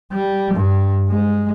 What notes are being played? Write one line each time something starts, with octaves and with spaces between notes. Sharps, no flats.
G3
G2
G#3